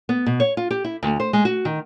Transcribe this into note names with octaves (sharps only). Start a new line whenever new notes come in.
B3
B2
C#5
F4
G4
E4
D2
C5
G#3
F#4
D#3